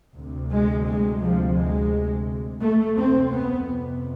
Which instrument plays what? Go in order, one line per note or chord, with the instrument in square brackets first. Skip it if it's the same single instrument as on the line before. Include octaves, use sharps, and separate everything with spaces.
[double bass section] D2 C3
G#3
G#3
F3
G#3
A3
F2 C3 C4
B3